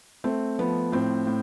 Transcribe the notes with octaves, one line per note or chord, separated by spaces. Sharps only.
A3 C4
F3 B3
A2 C4
A2